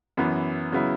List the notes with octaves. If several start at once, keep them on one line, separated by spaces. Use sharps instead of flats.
F#2 E3 B3
C#3 F#3 B3 E4